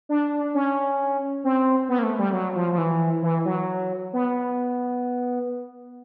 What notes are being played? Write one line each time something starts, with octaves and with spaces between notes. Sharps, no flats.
D4
C#4
C4
B3
A#3
A3
G3
F#3
F3
F3
E3
E3
F#3
B3